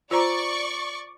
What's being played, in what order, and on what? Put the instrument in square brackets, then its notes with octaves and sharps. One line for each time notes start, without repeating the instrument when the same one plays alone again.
[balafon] F4 C5 A#5 [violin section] D5 C#6